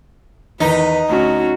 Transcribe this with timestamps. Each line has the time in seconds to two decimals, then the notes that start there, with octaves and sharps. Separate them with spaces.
0.60 E2 D#3 D#4 B4
1.09 D2 C#4 F#4 A#5